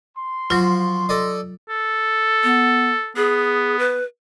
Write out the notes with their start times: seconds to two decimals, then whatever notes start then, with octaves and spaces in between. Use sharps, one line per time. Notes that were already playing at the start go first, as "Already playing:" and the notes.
0.17 C6
0.50 F3 F#3 F4 F#4
1.09 A4 D5 D#5
1.69 A4
2.44 B3
3.16 B3 G#4
3.79 B4